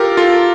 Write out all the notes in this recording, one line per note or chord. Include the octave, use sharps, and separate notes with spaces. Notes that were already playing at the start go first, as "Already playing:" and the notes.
Already playing: F4 G4 A4 A#4
F4 A4